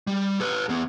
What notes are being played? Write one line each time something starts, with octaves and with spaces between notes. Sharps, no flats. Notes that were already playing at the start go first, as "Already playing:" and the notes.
G3
A4 B4
E2 B3